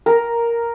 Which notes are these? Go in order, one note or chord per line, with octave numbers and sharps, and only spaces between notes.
A#4